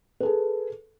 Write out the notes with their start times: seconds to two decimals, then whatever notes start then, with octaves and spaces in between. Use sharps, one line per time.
0.20 B4
0.23 A4
0.25 G#4